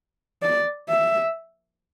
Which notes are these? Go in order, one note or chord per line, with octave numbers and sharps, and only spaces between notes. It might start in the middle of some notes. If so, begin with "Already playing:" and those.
D5
E5